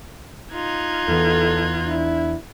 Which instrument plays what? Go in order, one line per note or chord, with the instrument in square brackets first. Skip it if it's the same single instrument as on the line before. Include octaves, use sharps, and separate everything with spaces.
[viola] D#4 F4 [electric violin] F#6 G#6
[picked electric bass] E2 E3 [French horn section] A4
[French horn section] D4 E4